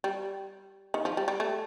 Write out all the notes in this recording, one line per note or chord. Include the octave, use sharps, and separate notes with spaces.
G3
D#3
F3
G3
G3
A3